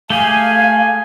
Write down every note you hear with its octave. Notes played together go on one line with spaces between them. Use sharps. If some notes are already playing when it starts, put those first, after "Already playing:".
A3 G4 G#4 F5 G#5